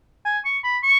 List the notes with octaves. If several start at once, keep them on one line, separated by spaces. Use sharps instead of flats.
G#5
C#6
B5
C#6